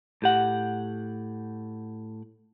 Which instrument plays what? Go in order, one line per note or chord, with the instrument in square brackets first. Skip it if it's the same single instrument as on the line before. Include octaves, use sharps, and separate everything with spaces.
[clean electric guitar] A2 G4 F#5